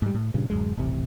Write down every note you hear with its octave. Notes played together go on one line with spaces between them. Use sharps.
G#2 G3
A2
G2 A#2 C#3
D1 F#2 G#3
D#1 A1 C3